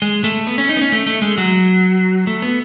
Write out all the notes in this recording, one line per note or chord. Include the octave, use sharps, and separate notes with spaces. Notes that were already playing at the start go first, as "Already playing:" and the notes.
G#3
A3
B3
C#4
D#4
B3
C#4
A3
A3
G#3
F#3
A3
B3